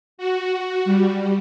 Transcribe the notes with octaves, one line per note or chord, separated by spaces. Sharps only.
F#4
G3